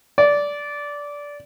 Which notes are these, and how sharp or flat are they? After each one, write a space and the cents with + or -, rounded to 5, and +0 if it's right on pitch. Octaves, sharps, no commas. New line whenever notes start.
D5 -15